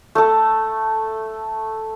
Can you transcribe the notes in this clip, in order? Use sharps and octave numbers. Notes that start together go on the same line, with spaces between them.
A3 A4